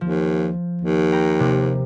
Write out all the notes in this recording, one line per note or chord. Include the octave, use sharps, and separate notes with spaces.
D#2 F3
D#2
G5 A#5 B5
C3 A#3